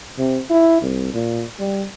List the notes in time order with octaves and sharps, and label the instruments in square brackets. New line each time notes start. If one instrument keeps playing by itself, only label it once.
[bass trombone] C3
E4
C2
A#2
G3